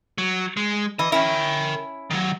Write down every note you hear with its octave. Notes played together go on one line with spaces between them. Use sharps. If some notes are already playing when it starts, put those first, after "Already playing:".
F#3
G#3
E3 D#5
C#4 E4 A#4 G5
D#3 F#3